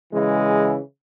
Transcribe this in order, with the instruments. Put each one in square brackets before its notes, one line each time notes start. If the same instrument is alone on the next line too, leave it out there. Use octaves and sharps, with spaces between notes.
[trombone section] C#3 E3 G#3